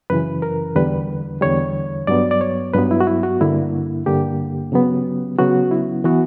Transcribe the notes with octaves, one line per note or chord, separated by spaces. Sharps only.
F#2 C#3 E3 B4
A#4
E2 D3 G3 B4
E2 D3 G3 C#5
G2 F#3 B3 D5
D5
C#5
G2 F#3 B3 B4
E4
F#4
E4
F#4
G2 D3 A#3 E4
G2 D3 A#3 G4
C#3 F#3 B3
C#3 F#3 B3 F#4
E4
E3 B3 F#4